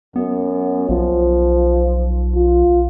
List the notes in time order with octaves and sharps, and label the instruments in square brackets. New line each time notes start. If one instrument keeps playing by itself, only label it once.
[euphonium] F#2 [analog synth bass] B3
[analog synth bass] B1 [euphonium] F3
[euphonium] F4